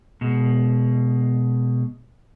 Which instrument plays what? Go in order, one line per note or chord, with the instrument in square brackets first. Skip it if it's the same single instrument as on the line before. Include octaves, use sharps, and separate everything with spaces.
[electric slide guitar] B2 G#3